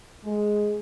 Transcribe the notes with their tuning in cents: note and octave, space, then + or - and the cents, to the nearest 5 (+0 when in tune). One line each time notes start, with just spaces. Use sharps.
G#3 +5